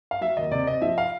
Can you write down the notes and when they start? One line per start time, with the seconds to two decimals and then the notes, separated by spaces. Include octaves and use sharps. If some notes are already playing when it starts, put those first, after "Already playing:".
0.11 F5
0.21 F#3 E5
0.37 D#2 D#5
0.51 C3 D5
0.67 C3 D#5
0.82 F3 E5
0.98 F5